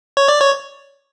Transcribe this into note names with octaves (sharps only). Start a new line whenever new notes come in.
C#5
D5
C#5